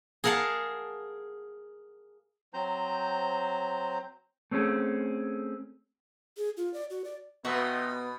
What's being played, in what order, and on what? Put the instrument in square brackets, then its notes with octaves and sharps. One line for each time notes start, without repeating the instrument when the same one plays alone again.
[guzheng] G#4 A#4 F5 F#5 A5
[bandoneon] F#3 C4 C5 A#5 G6
[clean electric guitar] A3 C4 C#4 G#4 A4
[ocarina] G#4
F4
D5
F#4
D5
[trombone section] F2 D#4 [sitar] B2 [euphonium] B3 [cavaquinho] F#4 D#5 E5